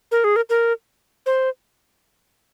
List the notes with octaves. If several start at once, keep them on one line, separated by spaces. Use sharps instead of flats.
A#4
G#4
A#4
A#4
C5